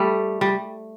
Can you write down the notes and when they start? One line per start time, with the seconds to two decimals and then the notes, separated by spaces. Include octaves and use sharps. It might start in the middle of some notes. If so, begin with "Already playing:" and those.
Already playing: G3 A3
0.41 G3